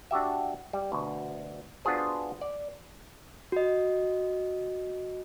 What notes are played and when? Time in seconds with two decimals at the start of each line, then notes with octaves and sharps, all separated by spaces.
0.11 D4 F#4 G4 E5
0.73 G3
0.92 D2 B2
1.85 B3 D4 F4 F#4 G#4 C5
2.41 D5
3.52 F#4 D#5